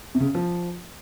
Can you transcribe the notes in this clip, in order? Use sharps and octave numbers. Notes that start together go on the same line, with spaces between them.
C3
C#3
F3